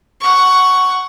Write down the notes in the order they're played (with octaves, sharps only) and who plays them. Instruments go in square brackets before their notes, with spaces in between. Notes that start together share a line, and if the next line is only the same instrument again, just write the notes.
[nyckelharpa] F#5 C#6